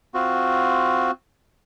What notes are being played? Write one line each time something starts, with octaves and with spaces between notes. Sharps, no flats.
C4 F4 F#4